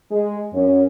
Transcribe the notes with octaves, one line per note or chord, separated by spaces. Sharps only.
G#3
F#2 C#4